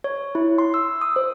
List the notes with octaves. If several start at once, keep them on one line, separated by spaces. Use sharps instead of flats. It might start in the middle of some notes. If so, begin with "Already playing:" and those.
C#5
E4
C6
E6
D#6
C5